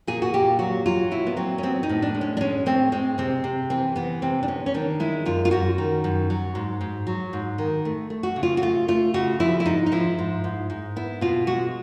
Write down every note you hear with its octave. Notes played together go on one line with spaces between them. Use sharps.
A#2 G#4
F#4
A#2 G4
F#3 F#4
F#3 F4
A#2 E4
B3
F#3 C4
C#4
B3 C4
D#4
A2
D4
G#3
C#4
D4
G#3 C#4
A2 C4
G#3 C4
C3 C4
C3
E3 C4
E3 B3
C3 C4
D4
B3 C#4
C#4
D#3 D4
G#3 E4
F#2 F4
F4
F#2 F#4
D#3
F#2
F#3
G#2
G#2
F#3
G#2
D#3
A3
A3
F#4
C#3
F4
F#4
A3 F4
A3 F4
C#3 F#4
F3 E4
E4
G#2 D#4
D#4
F3 E4
G#2
G#2
G#2
B3 E4
B2 F4
G#3 F#4